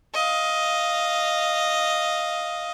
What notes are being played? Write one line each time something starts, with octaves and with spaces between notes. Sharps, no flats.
D#5 F5